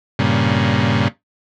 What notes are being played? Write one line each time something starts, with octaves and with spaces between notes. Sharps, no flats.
G2 A#2 C#3